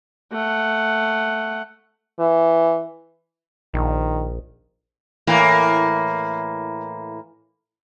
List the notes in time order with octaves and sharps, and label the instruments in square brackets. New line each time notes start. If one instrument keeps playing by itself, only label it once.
[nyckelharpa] A3 F#5
[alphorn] E3
[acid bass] A#1 [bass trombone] D#3
[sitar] A2 E3 A#3